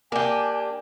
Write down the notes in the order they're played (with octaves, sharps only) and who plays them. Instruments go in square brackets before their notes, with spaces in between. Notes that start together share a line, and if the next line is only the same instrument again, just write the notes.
[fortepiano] A#3 [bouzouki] D4 G4 [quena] G#5